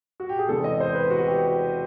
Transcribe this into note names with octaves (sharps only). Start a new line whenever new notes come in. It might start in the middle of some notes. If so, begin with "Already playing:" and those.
F#4
G4
G#4
E2 C3 E3 G#3 A4
D#5
C5
B4
F#4
F#4
G4